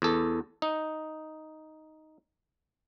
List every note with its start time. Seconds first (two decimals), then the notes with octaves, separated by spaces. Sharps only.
0.02 E2 A4
0.62 D#4